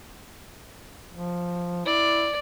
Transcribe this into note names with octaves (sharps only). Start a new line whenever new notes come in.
F3
E4 D5